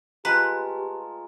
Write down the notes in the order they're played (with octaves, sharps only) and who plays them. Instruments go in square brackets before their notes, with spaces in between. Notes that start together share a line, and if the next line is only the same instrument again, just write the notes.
[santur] G#3 A3 F4 [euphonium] G4 [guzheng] B4 [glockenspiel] A#5